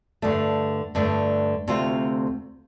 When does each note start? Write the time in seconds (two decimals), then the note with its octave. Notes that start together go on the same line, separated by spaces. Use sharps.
0.22 G2 D3 A3 D4
0.95 G2 D3 A3 D4
1.68 D2 C3 A3 C4 F4